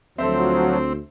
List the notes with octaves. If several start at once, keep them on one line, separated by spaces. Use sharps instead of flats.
D2 F3 F#3 C4 A4 C5 E5